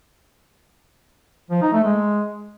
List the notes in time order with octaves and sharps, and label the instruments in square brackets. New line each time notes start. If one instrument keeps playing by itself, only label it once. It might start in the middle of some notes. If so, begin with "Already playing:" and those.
[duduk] F3
D#4
A3
G#3